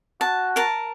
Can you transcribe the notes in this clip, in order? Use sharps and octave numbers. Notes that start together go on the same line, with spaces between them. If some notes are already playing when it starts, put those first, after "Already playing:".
F#4 A5
A#4 A5